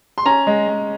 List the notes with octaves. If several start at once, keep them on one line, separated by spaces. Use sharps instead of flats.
C6
C#4 A#5
G#3
G#3